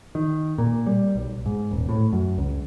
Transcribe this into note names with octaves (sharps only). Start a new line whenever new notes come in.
D#3
A#2
G3
B1
G#2
D#1
A2
F#2
C#2